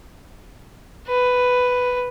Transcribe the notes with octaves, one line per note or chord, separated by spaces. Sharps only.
B4